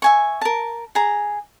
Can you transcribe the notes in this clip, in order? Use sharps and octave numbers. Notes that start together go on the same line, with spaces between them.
E5 G#5 C#6
A#4 A5
G#4 A#5